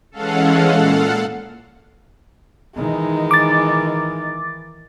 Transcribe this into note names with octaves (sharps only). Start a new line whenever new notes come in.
E3 G#3 C#4 A4 F5 F#5
A#2
D#3 E3 G#3 D#4
D6 A6